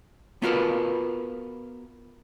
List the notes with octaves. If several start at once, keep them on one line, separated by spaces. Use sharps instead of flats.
B3 F4 F#4 A#4 B4